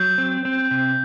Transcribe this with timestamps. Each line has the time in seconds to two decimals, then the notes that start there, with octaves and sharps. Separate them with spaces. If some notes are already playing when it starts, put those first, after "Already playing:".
Already playing: F#3 G6
0.18 C4
0.45 C4
0.71 C3